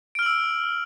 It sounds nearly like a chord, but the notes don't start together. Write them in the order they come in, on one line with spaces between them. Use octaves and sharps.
D7 F6 F#7 E6